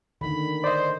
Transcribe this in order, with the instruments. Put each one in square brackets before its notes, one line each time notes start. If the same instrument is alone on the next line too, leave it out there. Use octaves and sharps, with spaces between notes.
[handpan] D3 D#3 [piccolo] B5
[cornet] C5 [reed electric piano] D5 D#5